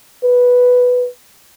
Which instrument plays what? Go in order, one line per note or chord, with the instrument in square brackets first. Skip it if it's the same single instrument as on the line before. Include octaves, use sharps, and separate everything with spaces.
[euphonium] B4